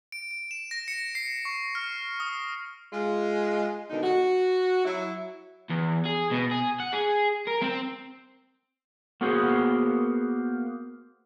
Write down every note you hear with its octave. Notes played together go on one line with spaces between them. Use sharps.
D7
D7
E7
A#6
C#7
C7
C#6
F6
D#6
G#3 F4
B2 D3 D#3 D#4
F#4
F#3 E4
E2
G#4
B2
G#4
F#5
G#4
A#4
C4
A#3 B3 F#4 G#4 C5